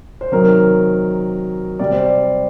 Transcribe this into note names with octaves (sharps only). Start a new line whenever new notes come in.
C5
C3 D#3 F#3 A#4
C3 G3 D5
C5
D5